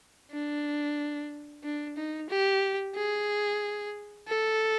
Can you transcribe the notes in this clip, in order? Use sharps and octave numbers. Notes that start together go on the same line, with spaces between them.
D4
D4
D#4
G4
G#4
A4